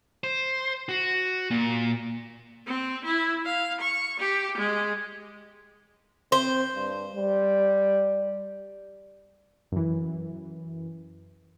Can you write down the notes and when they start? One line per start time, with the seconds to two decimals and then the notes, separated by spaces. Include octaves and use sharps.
0.24 C5
0.89 F#4
1.51 A#2
2.67 C4
3.04 E4
3.46 F5
3.80 C#6
4.19 G4
4.57 G#3
6.32 C4 C5
6.75 G2
7.16 G3
9.72 F#2 E3